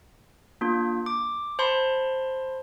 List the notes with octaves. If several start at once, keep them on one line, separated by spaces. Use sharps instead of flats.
A#3 D4 F4
D6
C5 A5 B5 C6